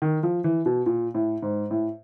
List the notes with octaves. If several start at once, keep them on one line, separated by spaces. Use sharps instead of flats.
D#3
F3
E3
B2
A#2
A2
G#2
A2